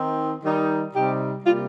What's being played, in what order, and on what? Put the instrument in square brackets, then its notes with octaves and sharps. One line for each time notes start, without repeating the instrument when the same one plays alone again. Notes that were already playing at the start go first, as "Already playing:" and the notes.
Already playing: [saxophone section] D#3 C4 D#4
D#3 G3 D#4
C3 G3 D#4 G4
C3 G3 A#3 F4